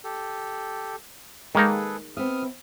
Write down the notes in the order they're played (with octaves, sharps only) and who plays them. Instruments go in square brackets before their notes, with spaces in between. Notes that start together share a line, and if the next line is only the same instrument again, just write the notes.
[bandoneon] G4 A4
[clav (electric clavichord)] D#3 A#3 D#4 [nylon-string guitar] G#3 [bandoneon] G#4 A4 B4
[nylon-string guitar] B3 C4 E5 [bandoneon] D#6 F6